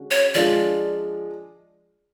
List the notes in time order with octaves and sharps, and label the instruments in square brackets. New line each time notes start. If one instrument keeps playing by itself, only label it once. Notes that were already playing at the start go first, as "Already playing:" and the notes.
Already playing: [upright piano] D3 G#3 C#4 F#4
[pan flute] C#5
[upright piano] F3 G#3 D4 F4 [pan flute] D5